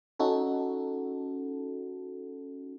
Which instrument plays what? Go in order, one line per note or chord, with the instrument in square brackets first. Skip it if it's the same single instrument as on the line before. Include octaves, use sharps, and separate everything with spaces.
[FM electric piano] C#4 D#4 F#4 A4